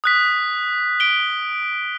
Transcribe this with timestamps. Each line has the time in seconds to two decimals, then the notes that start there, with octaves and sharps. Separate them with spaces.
0.04 D#6 F#6 B6
1.00 D7 G7